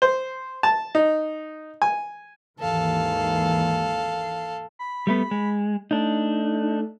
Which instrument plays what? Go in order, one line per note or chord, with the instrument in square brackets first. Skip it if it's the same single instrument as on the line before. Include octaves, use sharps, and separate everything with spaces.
[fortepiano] C5
A5
D#4
G#5
[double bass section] D#2 G#2 E3 [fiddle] A4 F5
[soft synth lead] B5
[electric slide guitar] G3 A3 B3
G#3
[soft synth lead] A3 [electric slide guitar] D4 D#4